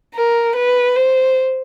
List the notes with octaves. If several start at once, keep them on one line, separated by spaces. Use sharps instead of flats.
A#4
B4
C5